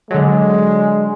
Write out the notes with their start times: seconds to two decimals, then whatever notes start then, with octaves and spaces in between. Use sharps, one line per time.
0.11 D3 F#3 G#3